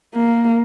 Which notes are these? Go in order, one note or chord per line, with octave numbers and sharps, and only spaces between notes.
A#3